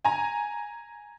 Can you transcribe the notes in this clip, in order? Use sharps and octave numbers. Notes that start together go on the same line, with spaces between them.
G#5 A#5